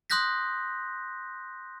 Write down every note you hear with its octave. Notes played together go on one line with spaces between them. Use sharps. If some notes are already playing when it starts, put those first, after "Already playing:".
C6 D#6 F#6 G6 A#6 B6